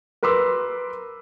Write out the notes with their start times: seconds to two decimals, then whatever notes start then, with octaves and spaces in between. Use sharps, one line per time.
0.23 A#4 B4 C6 D6 E6